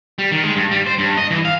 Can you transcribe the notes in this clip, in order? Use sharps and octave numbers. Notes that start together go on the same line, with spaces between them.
G3
D#3
G#3
G2
G3
C5
G2
D#5
E3
F5